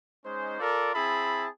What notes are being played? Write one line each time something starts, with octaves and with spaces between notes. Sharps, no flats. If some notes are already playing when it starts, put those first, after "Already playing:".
G#3 C#4 D#4 C5
F4 A4 A#4 D5
C4 E4 G#4 A5 B5